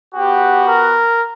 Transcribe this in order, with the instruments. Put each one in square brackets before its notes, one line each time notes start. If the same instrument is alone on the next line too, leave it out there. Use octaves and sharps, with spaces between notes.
[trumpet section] B3 F#4 G4
A#4